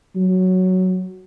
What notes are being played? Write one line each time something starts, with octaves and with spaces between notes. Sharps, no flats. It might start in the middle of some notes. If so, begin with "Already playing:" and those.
F#3